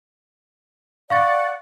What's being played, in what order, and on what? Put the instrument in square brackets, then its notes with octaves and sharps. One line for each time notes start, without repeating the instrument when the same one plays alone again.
[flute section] D5 F#5 [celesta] F5 C#6 A6